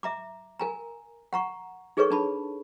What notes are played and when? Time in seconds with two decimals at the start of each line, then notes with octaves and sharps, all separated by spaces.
0.03 E5 A#5 D6
0.60 A#4 G#5 A#5
1.33 F#5 A#5 C#6
1.97 D#4 G#4 A4 B4 C#5 C#6
2.11 D4 A5 B5